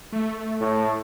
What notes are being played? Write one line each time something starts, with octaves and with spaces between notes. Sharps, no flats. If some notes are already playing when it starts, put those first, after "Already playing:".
A3
A2